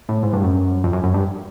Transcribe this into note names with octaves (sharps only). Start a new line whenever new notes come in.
A2
G#2
G2
F#2
F2
F#2
F#2
G2